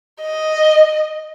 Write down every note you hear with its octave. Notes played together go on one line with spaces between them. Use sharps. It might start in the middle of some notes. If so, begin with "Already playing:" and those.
D#5